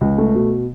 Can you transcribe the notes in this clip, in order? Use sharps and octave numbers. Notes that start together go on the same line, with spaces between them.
C#2
A3
B2